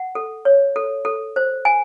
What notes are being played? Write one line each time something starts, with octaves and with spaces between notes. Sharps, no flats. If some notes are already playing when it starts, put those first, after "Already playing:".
Already playing: F#5
A4
C#5
A4
A4
C5
G#5